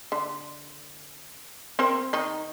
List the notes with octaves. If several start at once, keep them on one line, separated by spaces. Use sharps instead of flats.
D3
C4 A#4 C5
D#3 D#4